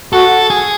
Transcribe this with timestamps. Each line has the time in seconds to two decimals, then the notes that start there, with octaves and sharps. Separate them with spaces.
0.13 F#4 A4
0.50 G#4